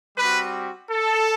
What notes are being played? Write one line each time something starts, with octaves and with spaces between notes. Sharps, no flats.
G3 C4 F#4 B4
A4